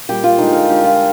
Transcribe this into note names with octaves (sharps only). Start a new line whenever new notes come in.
A#2 G3 G4
F4
D3 G#3 D#4
A#4
D3 G#3 G4
F4